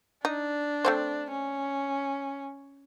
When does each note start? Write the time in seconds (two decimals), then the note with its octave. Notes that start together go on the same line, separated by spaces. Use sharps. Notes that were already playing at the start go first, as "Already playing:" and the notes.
0.25 D4 D#4
0.85 A3 C4 C5
1.31 C#4